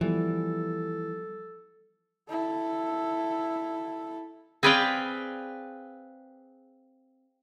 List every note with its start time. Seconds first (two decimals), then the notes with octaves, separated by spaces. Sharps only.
0.01 E3 F3 G3 B3 A4
2.29 E4 A4
4.63 C4 G#4 B4 D5 F5 G5